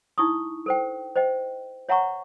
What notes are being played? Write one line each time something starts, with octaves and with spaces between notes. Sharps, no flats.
D#4 E4 C#6 D#6
A4 C5 G5
C5 D#5 G5
C#5 E5 F#5 A#5 C#6